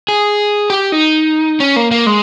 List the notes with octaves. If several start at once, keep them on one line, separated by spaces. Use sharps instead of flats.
G#4
G4
D#4
C#4
A#3
A#3
G#3